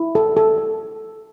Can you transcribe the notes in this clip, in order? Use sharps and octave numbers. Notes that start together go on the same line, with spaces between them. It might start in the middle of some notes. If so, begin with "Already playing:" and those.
Already playing: E4
A4
A4
A4